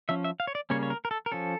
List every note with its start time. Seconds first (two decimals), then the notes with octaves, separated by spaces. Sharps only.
0.09 F3 C#4 E5
0.24 E5
0.40 F5
0.47 C#5
0.55 D5
0.70 C#3 G3 A#3 C#4 C#5
0.83 C#5
0.90 A#4
1.05 A#4
1.11 A4
1.26 A#4
1.32 F3 C#4 A4